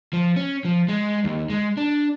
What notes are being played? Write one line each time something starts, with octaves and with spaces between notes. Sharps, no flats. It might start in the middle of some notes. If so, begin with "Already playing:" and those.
F3
C#4
F3
G#3
D#2
G#3
D4